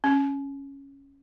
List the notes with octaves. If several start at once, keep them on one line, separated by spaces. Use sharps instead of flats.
C#4